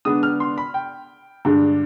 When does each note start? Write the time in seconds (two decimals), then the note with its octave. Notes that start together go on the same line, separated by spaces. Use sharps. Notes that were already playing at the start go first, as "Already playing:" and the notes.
0.05 D3 G#3 B3 D4 D#6
0.23 F6
0.40 C6
0.58 B5
0.74 G5
1.45 G2 D3 G#3 D4